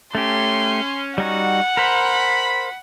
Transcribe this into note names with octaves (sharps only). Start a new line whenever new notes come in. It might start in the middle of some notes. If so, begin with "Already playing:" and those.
A3 C#4 G4 C6
G3 D#4 F#4 F#5
A#4 C5 B5